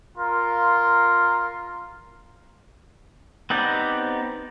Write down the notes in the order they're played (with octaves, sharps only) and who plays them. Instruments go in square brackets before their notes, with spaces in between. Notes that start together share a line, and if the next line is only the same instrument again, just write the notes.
[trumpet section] F4 A#4 C6
[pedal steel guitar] B3 C4 D#4 G4 D5